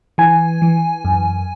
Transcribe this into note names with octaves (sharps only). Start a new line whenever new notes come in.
E3 G#5
E3
F#2